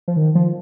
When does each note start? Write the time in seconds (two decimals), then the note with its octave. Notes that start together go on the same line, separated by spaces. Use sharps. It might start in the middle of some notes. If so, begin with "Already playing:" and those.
0.08 F3
0.17 D#3
0.35 F3